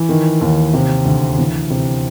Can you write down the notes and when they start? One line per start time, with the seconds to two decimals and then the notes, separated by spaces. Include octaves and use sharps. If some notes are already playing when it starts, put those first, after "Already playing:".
Already playing: E3
0.09 D#3
0.41 D#2
0.74 C3
1.05 D2
1.38 E3
1.70 C3